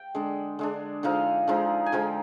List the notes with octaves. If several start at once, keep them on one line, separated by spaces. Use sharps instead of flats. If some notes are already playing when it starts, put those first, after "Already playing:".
Already playing: G5
D3 G#3 D4
D3 G#3 D4
D3 F3 G#3 D#4 F5
D3 F3 G#3 D#4
G#5
D3 F3 G#3 D#4 G5